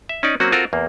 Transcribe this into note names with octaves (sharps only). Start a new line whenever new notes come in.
E5
C#4 D#4 D5
F#3 A#3 C4 C#4 F#4
C4 F4 F#4 A4 A#4
E2 A#3